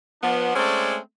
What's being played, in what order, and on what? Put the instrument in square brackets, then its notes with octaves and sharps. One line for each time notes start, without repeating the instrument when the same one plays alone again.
[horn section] F3 B3 D4
G#3 A3 C4 C#4 A4 D5